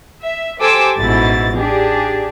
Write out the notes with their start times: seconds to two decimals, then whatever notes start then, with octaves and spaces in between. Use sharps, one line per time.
0.21 E5
0.60 G4 A4 C5 G#5 D6 E6
0.97 A1 G#2 B2 E4 A6
1.54 D4 G4 G#4